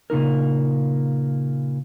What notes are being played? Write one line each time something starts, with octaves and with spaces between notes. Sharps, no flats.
A#2 C#3 D#4 A#4